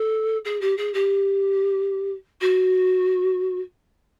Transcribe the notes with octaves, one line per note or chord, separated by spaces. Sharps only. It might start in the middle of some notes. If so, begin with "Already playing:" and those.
Already playing: A4
G#4
G4
G#4
G4
F#4